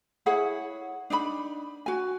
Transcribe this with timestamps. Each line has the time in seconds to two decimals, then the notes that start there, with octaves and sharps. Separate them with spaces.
0.26 E4 G#4 C#5 F#5
1.10 D4 D#4 D#5 B5
1.86 F#4 G#5